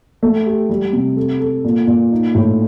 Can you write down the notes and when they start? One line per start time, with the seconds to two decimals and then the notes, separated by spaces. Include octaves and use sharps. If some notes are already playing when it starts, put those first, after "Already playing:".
0.23 A3
0.46 G4
0.69 G3
0.93 C3
1.16 A4
1.40 A4
1.64 A#2
1.87 A#2
2.12 D#4
2.35 A2